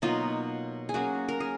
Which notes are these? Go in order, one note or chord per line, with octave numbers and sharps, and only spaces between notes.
B2 F#3 A#3 D#4 F4
G#4
F#3 A#3 C#4 F#4
A#4
G#4